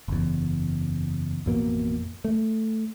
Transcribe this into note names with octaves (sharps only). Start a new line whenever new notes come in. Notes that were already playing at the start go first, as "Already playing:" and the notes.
F#1 E2
A1 F2 B2 A#3
A3